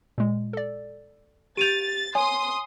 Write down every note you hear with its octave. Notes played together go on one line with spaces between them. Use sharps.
A#2 G#3
A4 D5
G4 G6 A6 D7 D#7 F7
C#5 G#5 C6 D#6